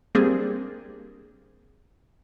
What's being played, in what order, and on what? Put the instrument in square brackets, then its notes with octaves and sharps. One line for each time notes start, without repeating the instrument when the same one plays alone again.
[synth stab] G3 A#3 C4 D4 G#4